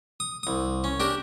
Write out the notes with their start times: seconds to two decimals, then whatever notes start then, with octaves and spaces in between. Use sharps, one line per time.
0.20 D#6
0.43 C2 D#6
0.84 C#4
1.00 D4 G4 A#4